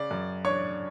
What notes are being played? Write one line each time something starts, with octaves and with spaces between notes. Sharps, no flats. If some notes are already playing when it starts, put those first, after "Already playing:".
Already playing: C#3 D5
F#2
D4 C#5 C#6